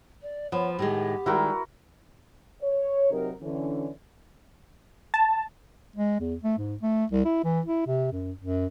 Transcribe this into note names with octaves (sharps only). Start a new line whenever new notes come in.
D5
F3 B3 C#5
A2 D#3 G#3 G4
D#3 G3 G#3 E4 F#4 A#4
C#5
C3 F#3 D#4 A#4
D3 E3 C#4
A5
G#3
E2
A3
G#2
A3
C2
E4
E3
E4
C3
F#2
F#2